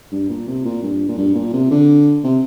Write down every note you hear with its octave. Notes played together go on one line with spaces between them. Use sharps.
G2
A#2
C3
A#2
G2
A#2
G2
A#2
C3
D3
C3